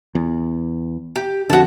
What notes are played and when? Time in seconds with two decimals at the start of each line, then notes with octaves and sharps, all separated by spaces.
0.15 E2
1.16 G4
1.50 F2 D3 F#4 A5